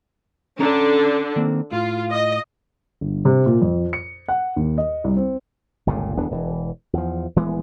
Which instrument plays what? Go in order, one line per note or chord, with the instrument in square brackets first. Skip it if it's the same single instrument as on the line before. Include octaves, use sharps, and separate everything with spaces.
[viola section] D3 D4 [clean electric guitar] C#4 A4 A#5
[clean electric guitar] D#3 A#3 C4
[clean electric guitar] A2 [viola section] F4
[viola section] D#5
[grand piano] G1
C3
A#2
F2
C#7
F#5
D#2
D#5
C2
C4
[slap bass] G1 C#2 A#2 C#3
D1 E2 B3 D4
E1 E3
E2 F3
D#1 E3 G#3 B3